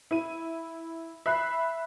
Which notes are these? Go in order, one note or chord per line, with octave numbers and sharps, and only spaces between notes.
E4 D#7
E5 B5 F#6 C7